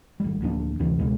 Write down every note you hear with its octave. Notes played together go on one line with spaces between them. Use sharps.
G#1 G3
D1 F3 A#3 D4
D2 C3 E3
C#2 B2 G#3